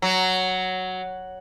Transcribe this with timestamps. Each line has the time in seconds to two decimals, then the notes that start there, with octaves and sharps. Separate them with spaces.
0.02 F#3